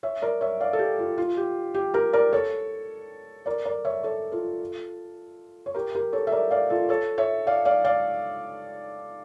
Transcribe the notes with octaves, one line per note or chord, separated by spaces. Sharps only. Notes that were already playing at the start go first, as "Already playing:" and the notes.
C#5 E5
A#4 D5
C#5 E5
D5 F5
A4
G4
F4
F4
G4
G4
G4 A#4
A#4 D5
A4 C#5
A#4 D5
A#4 D5
C#5 E5
A4 C#5
F4 A4
C#5
G4 A#4
G4 A#4
A4 C#5
E5
A#4 D5
D5 F5
F4 A4
A4 C#5
C#5 E5
D5 F5
D5 F5
D5 F5